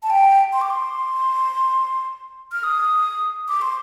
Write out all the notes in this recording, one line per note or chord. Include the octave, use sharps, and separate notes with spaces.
A5
G5
C6
D6
C6
F6
D#6
D6
C6